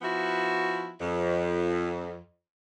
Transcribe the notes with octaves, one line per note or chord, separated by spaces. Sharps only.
F3 B3 E4 F#4
F2